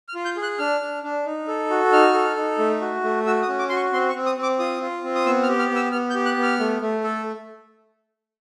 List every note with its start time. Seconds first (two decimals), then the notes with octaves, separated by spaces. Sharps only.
0.09 F6
0.15 F4
0.25 G6
0.37 G#4
0.43 F#6
0.59 D4 F6
0.81 D4
1.03 D4
1.26 D#4
1.48 A4
1.70 F#4
1.93 D#4 F6
2.14 A4
2.37 D#4
2.59 A3
2.81 F#4
3.04 A3
3.26 F#4 E6
3.42 D#6
3.48 C#4
3.59 D6
3.69 F#4 C6
3.76 C#6
3.93 C4 C6
4.09 C#6
4.15 C4
4.26 D#6
4.38 C4
4.43 D6
4.59 F4 D#6
4.81 F4
5.04 C4
5.15 D#6
5.26 B3 E6
5.43 F6
5.48 G4
5.59 F6
5.70 B3
5.76 E6
5.92 B3 F6
6.10 G6
6.15 G4
6.25 F#6
6.37 B3
6.43 F6
6.60 A3
6.82 A3
7.04 A4